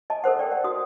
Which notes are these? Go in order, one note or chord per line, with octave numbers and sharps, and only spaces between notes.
D#5 G#5 A5
A4 A#4 C5 F#5
D5 G5
F#5
F#4 D#6